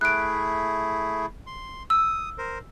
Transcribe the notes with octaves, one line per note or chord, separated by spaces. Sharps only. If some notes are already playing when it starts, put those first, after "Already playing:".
A3 E4 G#4 F#6 D7
C6
D#6 E6
A#4 C5